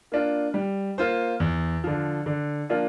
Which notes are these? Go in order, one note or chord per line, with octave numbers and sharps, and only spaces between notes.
A#3 D4 F4
G3
A#3 F4 C5
E2
D3 F3
D3
F3 A#3 D4 F4